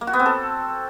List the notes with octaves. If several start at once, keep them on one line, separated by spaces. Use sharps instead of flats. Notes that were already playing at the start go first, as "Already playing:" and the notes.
A#3
F#4
B3
C4
A4